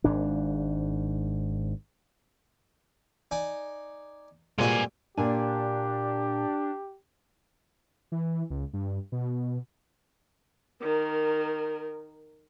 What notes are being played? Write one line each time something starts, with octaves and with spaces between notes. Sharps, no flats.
G#1 G#2 D4
D#4 D5 G#5
G2 A#2 G#3 A#3 C4 F#4 G#5
A#2 D4 G4 G#5
E3
C#2
G2
B2
D#3 A#4